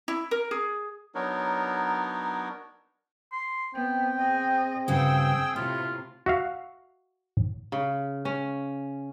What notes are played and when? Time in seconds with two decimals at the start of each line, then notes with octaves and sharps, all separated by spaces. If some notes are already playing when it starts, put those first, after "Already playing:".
0.08 E4
0.31 A#4
0.51 G#4
1.15 F#3 B3 D4 D#4 A#4 C#5
3.32 C6
3.75 B3 C4 G5
4.18 G#4 D#5
4.88 G2 C#3 F#4 G#4 G5 E6
5.56 A2 C3 E4 F4
6.26 F#4 E5 F5
7.72 C#3
8.25 C#4